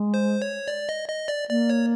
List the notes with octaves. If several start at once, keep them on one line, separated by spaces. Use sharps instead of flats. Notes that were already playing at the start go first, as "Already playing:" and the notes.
Already playing: G#3
C5
C#5
D5
D#5
D#5
D5
A#3 D5
C#5